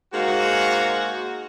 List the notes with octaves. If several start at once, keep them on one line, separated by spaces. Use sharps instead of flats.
G#2 G#3 A#3 F#4